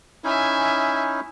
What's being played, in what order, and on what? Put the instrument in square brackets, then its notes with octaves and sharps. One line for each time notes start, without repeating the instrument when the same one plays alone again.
[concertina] C#4 D#4 E4 [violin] E5 G#5